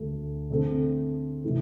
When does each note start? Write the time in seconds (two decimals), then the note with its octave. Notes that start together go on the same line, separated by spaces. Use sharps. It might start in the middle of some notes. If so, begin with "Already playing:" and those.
Already playing: D2 D3 A3
0.50 D3 A3 C4 A4
1.44 C3 E3 A3